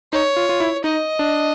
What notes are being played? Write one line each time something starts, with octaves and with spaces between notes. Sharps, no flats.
D#4 C#5
F4
F4
E4
D#4 D#5
D4